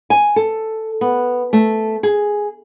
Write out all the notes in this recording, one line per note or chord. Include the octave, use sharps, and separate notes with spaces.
G#5
A4
B3
A3
G#4